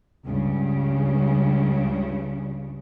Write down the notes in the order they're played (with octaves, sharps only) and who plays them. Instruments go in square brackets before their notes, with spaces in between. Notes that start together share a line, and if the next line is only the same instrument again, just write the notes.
[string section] C#2 G2 C#3